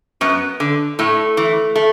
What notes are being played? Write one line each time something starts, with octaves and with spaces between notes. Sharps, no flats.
F#2 B3
D3
A2 A3
E3
A3